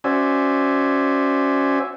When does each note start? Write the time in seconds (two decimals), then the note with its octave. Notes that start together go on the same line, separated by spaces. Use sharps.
0.04 C#4 F#4 C5 D5 E5 G#5